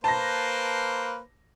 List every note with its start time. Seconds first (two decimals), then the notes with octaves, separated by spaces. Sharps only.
0.04 A#3 B4 C5 A5 A#6